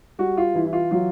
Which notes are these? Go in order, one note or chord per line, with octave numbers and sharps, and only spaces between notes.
G3 F#4
F4
E3 E4
E4
F4
F#3 F4